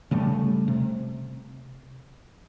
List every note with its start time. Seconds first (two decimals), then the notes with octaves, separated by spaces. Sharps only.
0.11 C#3 G3 A3
0.68 C3